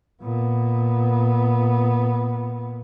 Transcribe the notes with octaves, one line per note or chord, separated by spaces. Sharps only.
A#2 B3